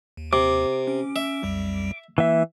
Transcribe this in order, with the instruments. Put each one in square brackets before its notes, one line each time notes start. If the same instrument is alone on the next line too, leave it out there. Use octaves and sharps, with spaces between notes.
[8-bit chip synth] D#2
[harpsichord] C3 [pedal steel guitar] D6
[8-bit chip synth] C#4
[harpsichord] E5
[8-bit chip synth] B1 F2 G3
[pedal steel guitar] E3 E5 [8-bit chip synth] A#3